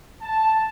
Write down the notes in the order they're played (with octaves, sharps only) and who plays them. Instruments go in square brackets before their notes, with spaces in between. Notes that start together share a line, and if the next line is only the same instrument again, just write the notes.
[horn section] A5